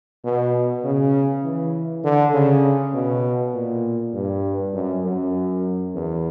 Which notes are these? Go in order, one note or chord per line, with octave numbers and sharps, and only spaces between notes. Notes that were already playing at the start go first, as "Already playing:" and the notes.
B2
C#3
E3
D3
C#3
B2
A#2
G2
F#2
F#2
E2